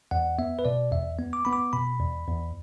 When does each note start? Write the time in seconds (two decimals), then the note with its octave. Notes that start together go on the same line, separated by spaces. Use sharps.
0.11 E2 F#5
0.39 B3 E5
0.59 B4
0.65 B2 D5
0.92 E2 E5
1.19 B3
1.33 D6
1.45 B3 B5
1.53 D6
1.73 B2 B5
1.99 E2
2.27 E2